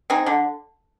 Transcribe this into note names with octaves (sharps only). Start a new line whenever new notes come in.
C4 D#4 G#4
D3